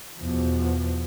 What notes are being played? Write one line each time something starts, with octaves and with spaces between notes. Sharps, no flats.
E2 B2 F3